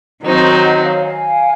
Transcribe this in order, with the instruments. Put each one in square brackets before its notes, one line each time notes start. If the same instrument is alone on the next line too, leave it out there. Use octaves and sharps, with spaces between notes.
[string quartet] D#3 F#3 C4 D#4 [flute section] C5 D#5
[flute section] D#5 F#5
C#5 F5
F5 G#5